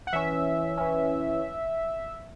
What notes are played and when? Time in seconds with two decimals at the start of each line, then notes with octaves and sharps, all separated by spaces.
0.07 F#5
0.13 E3 C#4 E5
0.77 E3 C#4